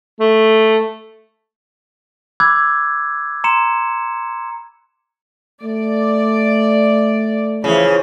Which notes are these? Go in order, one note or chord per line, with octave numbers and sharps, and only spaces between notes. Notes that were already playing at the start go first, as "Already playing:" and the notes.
A3
B5 D6 E6 F#6 G#6
A#5 C6 C#7 E7
A3 D5
C#3 E3 F3